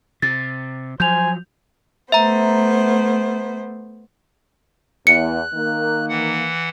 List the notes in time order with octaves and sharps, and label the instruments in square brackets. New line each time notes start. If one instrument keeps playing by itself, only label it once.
[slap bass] C3 [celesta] A6
[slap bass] F3 F#3 [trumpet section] C5 G#5 [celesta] G6 F7
[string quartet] A3 B3 C5 [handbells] E5 A#5
[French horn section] E2 [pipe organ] F#6 [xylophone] C#7
[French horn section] D#3 A#3
[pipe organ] E3 F#5